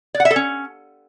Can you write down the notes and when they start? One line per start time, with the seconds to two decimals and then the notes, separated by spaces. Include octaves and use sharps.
0.14 D5
0.20 F#5
0.25 E5
0.31 A4
0.36 C#4